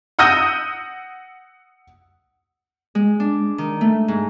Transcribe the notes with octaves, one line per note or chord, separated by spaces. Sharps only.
F#5 D#6 E6 G6 A#6 D#7
G#3
D4
D#3
A3
G#2